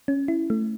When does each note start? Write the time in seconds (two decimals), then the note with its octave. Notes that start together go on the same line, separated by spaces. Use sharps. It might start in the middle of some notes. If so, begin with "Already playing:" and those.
0.08 C#4
0.28 E4
0.50 A3